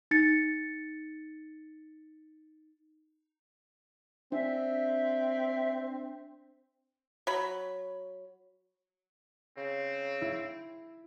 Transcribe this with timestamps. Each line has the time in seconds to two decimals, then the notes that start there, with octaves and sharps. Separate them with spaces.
0.11 D#4 A6 C#7
4.32 C4 D4 E5
7.27 F#3 B5
9.57 C#3 C4
10.22 E4